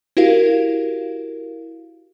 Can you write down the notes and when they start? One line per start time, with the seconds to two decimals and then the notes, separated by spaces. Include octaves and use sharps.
0.17 E4 F#4 G4 A#4 F5